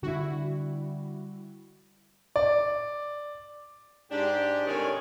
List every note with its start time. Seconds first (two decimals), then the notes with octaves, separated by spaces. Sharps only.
0.03 D3 G3 E4 F#4
2.36 D5
4.12 G#2 D4 G4
4.67 A2 C3 D#3 C#5 D5 G#5